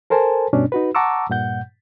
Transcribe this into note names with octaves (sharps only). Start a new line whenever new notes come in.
A4 A#4 C5 G#5 A5
G2 B2 C#4 D4
D#4 F#4 B4
F#5 A5 A#5 C#6 D6 E6
G2 A#2 F#5 G6